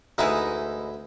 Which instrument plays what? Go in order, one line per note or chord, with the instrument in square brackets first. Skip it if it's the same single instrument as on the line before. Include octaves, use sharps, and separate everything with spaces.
[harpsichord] D2 E4 [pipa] E3 G#3 D#4